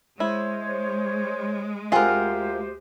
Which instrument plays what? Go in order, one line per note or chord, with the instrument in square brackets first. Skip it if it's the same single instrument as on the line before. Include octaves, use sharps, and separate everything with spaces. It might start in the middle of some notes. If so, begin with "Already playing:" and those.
[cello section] G#3 [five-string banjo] E4 [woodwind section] C5 C#5
[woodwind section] D2 G4 C5 [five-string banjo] C4 G#4 F#5 [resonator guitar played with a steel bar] F4 A#4